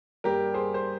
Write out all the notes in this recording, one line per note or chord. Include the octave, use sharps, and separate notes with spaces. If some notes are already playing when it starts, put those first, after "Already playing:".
G2 G3 A#3 G4 A#4
G#4 C5
C5